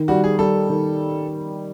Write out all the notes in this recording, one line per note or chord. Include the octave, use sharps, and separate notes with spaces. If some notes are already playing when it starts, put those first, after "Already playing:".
Already playing: D#3
G3 F#4
G#4
G3 A4
D#3